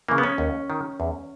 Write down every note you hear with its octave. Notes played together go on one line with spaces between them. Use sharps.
C#3 E3 A#3
B3
C#4
D#2
D#3
E2